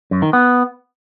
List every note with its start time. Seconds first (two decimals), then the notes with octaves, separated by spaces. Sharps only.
0.11 F#2
0.22 D#3
0.33 B3